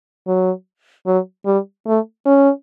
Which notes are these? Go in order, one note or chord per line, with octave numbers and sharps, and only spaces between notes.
F#3
F#3
G3
A3
C#4